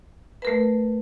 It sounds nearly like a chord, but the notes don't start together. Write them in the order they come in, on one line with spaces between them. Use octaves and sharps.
B4 A#4 A3